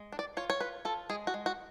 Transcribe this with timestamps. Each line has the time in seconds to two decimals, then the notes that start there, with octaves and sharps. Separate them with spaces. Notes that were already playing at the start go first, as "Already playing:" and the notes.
Already playing: G#3
0.12 D4
0.19 D5
0.37 F4 C#5
0.50 C#5
0.60 F4 B4
0.85 F4 A4
1.10 G#3 G#4
1.27 F#4
1.34 G#3
1.46 F#4